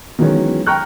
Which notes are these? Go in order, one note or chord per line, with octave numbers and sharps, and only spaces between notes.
D#3 E3 F#3 G#3 B3 C#4
G5 A#5 C#6 F6 F#6